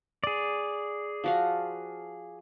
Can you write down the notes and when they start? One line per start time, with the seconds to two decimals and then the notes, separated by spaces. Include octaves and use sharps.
0.24 G#4 D5
1.24 F3 F#4 F5